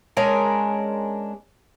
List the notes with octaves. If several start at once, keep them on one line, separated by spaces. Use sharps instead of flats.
G#3 C#4 D4 A#4